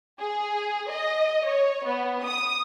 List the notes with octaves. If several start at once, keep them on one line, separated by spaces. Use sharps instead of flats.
G#4
D#5
C#5
B3
D#6